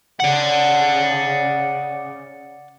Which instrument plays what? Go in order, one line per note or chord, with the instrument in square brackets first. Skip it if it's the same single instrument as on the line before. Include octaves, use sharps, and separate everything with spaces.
[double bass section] C#3 [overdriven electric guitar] D5 F#5